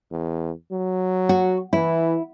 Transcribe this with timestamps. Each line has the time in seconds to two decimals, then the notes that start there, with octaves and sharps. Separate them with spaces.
0.11 E2
0.72 F#3
1.29 F#4
1.73 E3 E4